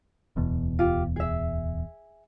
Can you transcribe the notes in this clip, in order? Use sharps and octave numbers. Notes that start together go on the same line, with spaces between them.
D1 E2 B2
F4 G4
G#4 E5